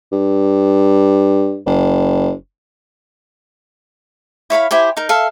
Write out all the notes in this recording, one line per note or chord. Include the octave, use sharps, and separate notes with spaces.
G2
F#1
E4 C#5 F5 B5
E4 G4 C5 G#5
D#4 A#4
A4 E5 F5